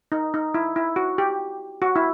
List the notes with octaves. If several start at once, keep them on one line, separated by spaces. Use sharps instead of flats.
D#4
D#4
E4
E4
F#4
G4
F#4
E4